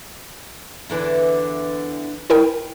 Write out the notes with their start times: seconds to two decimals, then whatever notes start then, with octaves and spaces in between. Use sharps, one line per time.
0.90 E2 D3 E3
2.30 E4 A#4 G5